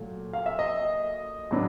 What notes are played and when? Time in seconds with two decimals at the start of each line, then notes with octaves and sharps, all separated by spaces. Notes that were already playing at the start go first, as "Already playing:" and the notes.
Already playing: A#2 F#3 A3
0.33 F5
0.46 E5
0.59 D#5
1.51 A2 F#3 B3 D4